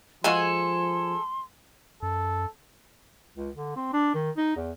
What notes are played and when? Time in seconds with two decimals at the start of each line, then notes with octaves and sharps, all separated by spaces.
0.24 F3 G#3 F4 F#4 G#4 A4 G#5 C6
2.03 F#2 A4
3.37 C#2
3.55 D3
3.77 C4
3.93 D4
4.15 D#3
4.37 D#4
4.57 E2